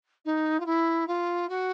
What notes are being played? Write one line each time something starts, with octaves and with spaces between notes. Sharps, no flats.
D#4
F4
E4
F4
F#4